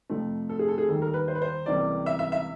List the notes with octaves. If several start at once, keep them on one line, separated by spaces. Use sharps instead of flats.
F2 C3 F3 A3
A4
G#4
A4
G#4
D#2 D#3 G3 A4
A#4
B4
C5
B4
C5
C#2 C3 E3 G3 A#3 D5
E5
E5
E5